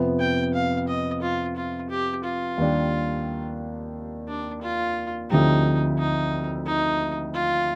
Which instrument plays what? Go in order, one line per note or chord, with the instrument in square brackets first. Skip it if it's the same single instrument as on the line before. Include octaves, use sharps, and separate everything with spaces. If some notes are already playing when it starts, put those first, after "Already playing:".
Already playing: [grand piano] F2 C3 F3 B3
[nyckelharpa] G5
F5
D#5
F4
F4
G4
F4
[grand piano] D#2 D#3 G3 D4 G4
[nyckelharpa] D4
F4
[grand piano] D2 D3 F3 C4 G4 [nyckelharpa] D#4
[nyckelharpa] D#4
D#4
F4